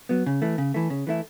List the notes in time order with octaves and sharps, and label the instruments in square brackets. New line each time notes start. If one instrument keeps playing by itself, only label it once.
[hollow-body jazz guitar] F#3 B3
C#3
E3 A3
C#3
E3 A3
C#3
E3 A3 E4